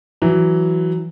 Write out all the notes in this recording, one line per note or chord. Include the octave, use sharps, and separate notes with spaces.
E3 F#3